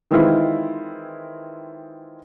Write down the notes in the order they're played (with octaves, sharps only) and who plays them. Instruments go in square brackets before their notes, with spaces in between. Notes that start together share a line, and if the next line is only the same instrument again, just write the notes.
[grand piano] D#3 E3 G#3 C4 E4 F4